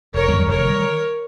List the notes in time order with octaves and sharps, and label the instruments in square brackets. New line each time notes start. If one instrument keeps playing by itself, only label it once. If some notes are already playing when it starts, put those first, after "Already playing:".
[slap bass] F1 [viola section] A#4 C#5
[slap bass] F2 D#3 G3
[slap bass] F1 [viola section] A#4 C#5
[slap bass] D#3 G3